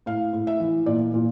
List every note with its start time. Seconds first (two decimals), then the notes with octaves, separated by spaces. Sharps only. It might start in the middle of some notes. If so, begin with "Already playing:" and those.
0.06 A2 F5
0.33 A2
0.47 E5
0.60 E3
0.86 A#2 D5
1.14 A#2